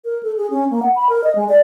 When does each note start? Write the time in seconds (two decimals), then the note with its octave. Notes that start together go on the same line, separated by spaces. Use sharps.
0.05 A#4
0.23 A4
0.37 G#4
0.50 C#4
0.71 A#3
0.82 F#5
0.96 B5
1.09 A#4
1.24 D#5
1.35 G#3
1.49 D5